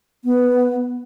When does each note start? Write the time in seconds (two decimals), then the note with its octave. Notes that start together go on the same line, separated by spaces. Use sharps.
0.25 B3